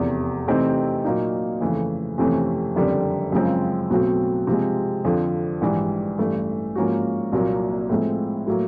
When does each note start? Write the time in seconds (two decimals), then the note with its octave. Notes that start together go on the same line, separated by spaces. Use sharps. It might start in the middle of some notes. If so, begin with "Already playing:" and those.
Already playing: F1 E2 C3
0.48 C3 E3 A3 C4 D#4
1.04 A#2 F#3 A#3 D#4
1.61 F2 C#3 E3 A3
2.18 F2 C3 E3 A3 C#4
2.75 F#1 F2 D3 G3
3.32 F#2 C#3 F3 G#3 C4
3.90 B1 B2 F#3 A3 C4
4.47 C3 F3 G#3
5.05 F2 D3 F3
5.61 A#1 G#2 E3 G3
6.18 A1 G2 E3 A3
6.76 G#2 F3 A#3 C#4 F#4
7.33 C2 A#2 F#3 A#3
7.89 A2 F3 G#3 C4
8.47 A2 F#3 A#3